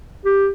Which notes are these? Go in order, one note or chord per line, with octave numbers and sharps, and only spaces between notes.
G4